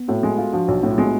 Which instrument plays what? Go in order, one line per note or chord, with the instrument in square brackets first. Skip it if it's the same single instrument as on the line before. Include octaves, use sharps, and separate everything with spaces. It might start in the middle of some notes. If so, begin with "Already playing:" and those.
Already playing: [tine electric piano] B3
[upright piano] A2 [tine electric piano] F#4 A4
[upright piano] G#3
F4
[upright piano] F3 [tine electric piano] D4 F#4
[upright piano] B1
A2
[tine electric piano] F4
[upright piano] G#3 [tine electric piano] B3 D4